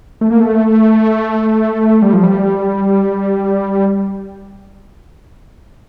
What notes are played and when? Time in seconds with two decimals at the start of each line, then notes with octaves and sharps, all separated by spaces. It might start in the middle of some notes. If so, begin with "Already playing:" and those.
0.21 A3
0.31 A#3
0.40 A3
2.02 G3
2.13 F3
2.23 G3